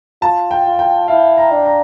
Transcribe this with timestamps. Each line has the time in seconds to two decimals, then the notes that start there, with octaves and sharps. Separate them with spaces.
0.22 F4 A5
0.51 G5
0.65 F4
0.79 G5
1.08 E4 F5
1.37 A#5
1.51 D4
1.65 A#5